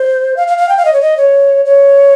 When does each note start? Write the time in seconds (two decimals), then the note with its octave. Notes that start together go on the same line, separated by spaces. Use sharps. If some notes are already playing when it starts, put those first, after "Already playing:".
Already playing: C5
0.37 F5
0.48 F5
0.58 F5
0.69 G5
0.77 F5
0.85 D#5
0.93 C#5
1.01 D#5
1.17 C#5
1.65 C#5